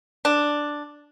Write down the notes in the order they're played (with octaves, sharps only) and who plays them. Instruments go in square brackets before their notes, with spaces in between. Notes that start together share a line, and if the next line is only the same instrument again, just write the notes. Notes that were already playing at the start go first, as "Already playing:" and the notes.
[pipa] D4